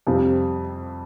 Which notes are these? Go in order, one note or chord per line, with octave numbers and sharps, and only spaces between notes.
F2 C3 G3 C4 F4